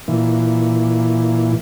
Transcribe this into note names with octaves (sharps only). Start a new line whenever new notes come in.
A#2 E3